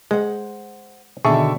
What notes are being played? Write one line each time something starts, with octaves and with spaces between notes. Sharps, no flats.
G#3 C5 F#5
B2 D3 D#3 G#4 E5 A5 C#6